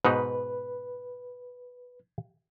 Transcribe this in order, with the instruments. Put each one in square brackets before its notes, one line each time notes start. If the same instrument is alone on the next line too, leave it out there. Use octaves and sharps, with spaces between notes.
[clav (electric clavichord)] G#2 B2 D#4 [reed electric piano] B4